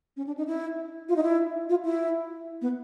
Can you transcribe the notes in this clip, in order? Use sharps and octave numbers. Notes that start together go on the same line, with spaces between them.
C#4
D4
D#4
E4
F4
D#4
E4
F4
E4
B3